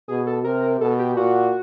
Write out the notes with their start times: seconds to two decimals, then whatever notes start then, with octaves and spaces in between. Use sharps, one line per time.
0.08 B2 G#4
0.27 A4
0.44 C3 A#4
0.80 B2 A4
0.99 G4
1.16 A#2 F#4